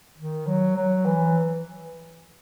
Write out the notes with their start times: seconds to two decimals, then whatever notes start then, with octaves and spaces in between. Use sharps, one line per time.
0.18 D#3
0.47 F#3
0.76 F#3
1.06 E3